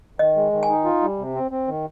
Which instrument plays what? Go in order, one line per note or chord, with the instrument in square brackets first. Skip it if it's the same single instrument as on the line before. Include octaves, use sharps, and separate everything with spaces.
[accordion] D#3 [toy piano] D#5
[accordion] G#3
D#3
[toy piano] G#5
[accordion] D#4
F4
G3
C3
C4
C4
D#3